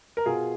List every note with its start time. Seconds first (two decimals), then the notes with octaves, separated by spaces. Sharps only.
0.17 A#4
0.26 B2 F4 G#4